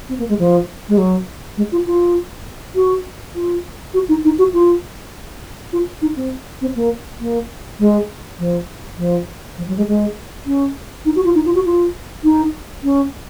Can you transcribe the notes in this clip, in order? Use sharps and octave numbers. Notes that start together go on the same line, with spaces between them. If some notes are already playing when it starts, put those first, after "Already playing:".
C4
A#3
G#3
F3
G#3
F#3
G#3
F4
F4
F#4
F4
F#4
D#4
D#4
F#4
F4
F4
D#4
C4
C4
A#3
A#3
G#3
F3
F3
F3
F#3
G#3
G#3
C#4
D#4
F#4
F4
D#4
F4
F#4
F4
D#4
C#4